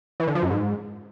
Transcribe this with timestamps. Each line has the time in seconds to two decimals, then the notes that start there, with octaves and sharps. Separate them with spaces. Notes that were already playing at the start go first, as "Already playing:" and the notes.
0.20 E3
0.27 D3
0.35 F3
0.43 F#2
0.51 G#2